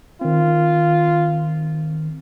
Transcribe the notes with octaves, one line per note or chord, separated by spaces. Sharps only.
D#3 C4 F4